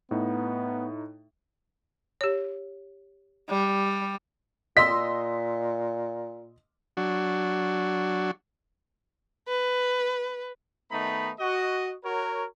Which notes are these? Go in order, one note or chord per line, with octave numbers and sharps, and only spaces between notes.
A2 B3 D#4
G4 C#5
G3
A#2 D#5 C6 E6 B6
F#3 D4 F#4
B4
D#3 A3 B3 D#4 A#5 B5
F#4 D#5
F#4 A#4 C#5